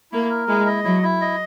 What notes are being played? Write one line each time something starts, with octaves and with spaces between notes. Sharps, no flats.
A#3 E4
A#4
G#3 E4
D#5
F#3 E4
E4
D#5